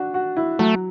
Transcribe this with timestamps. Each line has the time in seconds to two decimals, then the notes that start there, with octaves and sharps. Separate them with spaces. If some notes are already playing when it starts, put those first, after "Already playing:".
Already playing: D4 F#4
0.14 F#4
0.37 E4
0.59 F#3 A3